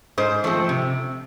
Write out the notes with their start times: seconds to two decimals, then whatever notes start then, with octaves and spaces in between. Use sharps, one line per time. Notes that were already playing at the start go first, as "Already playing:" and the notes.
0.18 G#2 C5
0.44 F3 A3 C4
0.69 C3